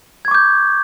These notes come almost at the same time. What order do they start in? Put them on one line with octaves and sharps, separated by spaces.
G#6 C#6 D6 G6